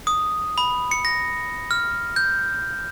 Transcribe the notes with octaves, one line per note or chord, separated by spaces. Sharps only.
D#6
B5
C#7
A#6
F6
G6